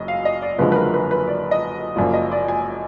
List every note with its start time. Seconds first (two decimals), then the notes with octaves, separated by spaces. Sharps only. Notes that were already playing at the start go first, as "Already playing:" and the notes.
Already playing: F#1 F#2 D#5
0.08 F5
0.25 D#5
0.42 D5
0.59 F#1 F#2 D3 F3 G#3 B4
0.72 B4
0.76 A#4
0.94 B4
1.11 B4
1.27 D5
1.51 D#5
1.96 F#1 F#2 F3 A#3 D5
2.14 D#5
2.32 D5
2.48 G#5